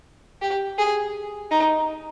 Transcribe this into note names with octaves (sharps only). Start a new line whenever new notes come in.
G4
G#4
D#4